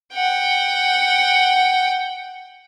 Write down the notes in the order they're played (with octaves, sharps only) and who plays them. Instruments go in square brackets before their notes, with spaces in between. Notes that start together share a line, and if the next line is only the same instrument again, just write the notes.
[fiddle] F#5 G5